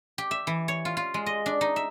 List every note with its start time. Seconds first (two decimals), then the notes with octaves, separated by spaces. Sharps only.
0.18 G4
0.31 E5
0.47 E3
0.68 C#5
0.85 F4
0.97 F4
1.14 G#3
1.26 D#5
1.46 D4
1.61 D#4
1.76 E5